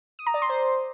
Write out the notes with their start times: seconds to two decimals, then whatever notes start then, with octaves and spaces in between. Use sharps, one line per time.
0.19 D#6
0.27 A#5
0.34 D5
0.42 C6
0.50 C5